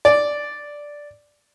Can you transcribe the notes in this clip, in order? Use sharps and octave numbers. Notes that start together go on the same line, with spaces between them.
D5